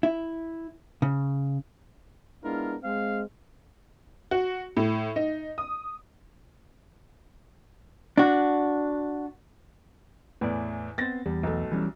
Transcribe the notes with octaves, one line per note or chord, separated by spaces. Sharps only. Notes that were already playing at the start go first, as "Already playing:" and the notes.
E4
C#3
G#3 B3 D4 E4 F4 A#4
G#3 C4 F5
F#4
A2
D#4
D#6
D4 F#4
E2 A2 E3 B4 D5
B3 C4 C5 A6 A#6
E2 G3
B1 A3
E3 G3 C#4